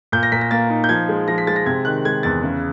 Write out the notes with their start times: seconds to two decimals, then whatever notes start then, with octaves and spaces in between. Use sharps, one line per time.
0.12 A#2 G6
0.23 A#6
0.32 A#2 B6
0.41 A#6
0.51 A#3 A6
0.70 D#4
0.84 G6
0.89 F3 G#6
1.09 G#3
1.28 F3 A#6
1.38 B6
1.47 G#3 A6
1.56 A#6
1.66 C3 G#6
1.85 D#3 F#6
2.05 G#3 G#6
2.23 E2 A6
2.43 C#3